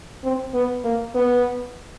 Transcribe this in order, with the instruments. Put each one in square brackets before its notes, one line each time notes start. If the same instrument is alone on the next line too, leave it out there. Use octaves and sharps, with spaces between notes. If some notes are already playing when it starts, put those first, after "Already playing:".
[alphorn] C4
B3
A#3
B3